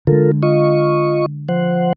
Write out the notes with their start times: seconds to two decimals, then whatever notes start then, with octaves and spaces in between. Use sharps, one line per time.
0.07 D3 G#3 F4 A4 A#4
0.43 F4 D#5 C#6
1.49 F3 C5 F#5